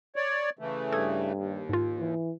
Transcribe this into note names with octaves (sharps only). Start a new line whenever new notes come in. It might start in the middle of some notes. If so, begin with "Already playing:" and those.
C#5 D5
C#3 E3 A3
G2 A4 D#6 G#6
D#2
G#2 F4
E3